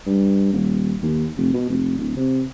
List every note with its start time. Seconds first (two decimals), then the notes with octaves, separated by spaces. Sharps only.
0.06 G2
0.53 D#1
1.03 D#2
1.37 F1
1.53 B2
1.69 F1
1.98 D1
2.16 C3